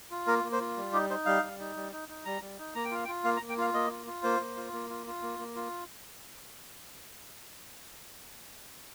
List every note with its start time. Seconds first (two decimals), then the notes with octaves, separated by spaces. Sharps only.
0.11 F4
0.27 A#3 A#4
0.44 A#3
0.52 C5
0.60 F4
0.77 G3
0.93 D#4 G4
1.10 D#4 C5
1.26 G3 F5
1.43 G3
1.60 D#4
1.76 G3
1.92 D#4
2.09 D#4
2.25 G3 A#5
2.42 G3
2.58 D#4
2.75 A#3 A#5
2.85 G5
2.91 F4 F5
3.05 G5
3.08 F4
3.24 A#3 F5
3.37 A#5
3.41 A#3
3.49 G5
3.58 F4 F5
3.74 A#3 D#5
3.90 F4
4.07 F4
4.23 A#3 C5
4.40 A#3
4.57 F4
4.73 A#3
4.90 F4
5.07 F4
5.22 A#3
5.39 A#3
5.56 F4